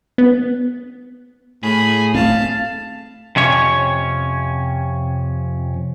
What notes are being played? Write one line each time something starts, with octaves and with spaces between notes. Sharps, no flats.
B3
A2 G#4 B5
A3 C4 F5 A5
F2 C3 C#4 C#5